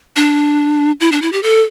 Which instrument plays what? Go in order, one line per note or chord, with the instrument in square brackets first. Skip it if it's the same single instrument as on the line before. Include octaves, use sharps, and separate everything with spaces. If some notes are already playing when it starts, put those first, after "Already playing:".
[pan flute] D4
E4
D4
E4
G4
A4